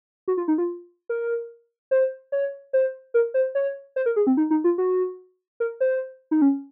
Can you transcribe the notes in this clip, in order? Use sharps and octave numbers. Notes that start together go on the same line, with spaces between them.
F#4
F4
D#4
F4
A#4
C5
C#5
C5
A#4
C5
C#5
C5
A#4
G#4
C4
D#4
D#4
F4
F#4
A#4
C5
D#4
C#4